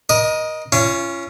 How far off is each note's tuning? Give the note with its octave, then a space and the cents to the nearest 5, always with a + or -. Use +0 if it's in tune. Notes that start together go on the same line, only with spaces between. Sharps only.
A#4 +35 D#5 +0
C#4 +0 F4 -40